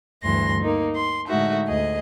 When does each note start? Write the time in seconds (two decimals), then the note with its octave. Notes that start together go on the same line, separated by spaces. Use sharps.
0.22 D2 G2 E3 C6 A#6
0.62 A#3 D#4
0.94 C6
1.27 A2 D3 G#3 D#4 F#4 E5
1.67 D2 G#4 D#5